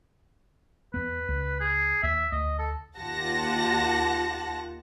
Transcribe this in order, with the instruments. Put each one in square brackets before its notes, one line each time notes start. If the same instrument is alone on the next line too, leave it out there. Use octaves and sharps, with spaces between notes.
[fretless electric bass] E2 B3 [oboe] B4
[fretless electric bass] C#2
[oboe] G#4
[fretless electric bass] D#2 [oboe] E5
[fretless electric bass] D2 [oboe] D#5
[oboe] A4
[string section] D#2 F4 G4 F#5 A5 A#6